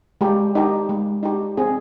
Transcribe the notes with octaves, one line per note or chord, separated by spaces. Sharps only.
G#3 G4
D#4 G4
G#3
D#4 G4
C4 G#4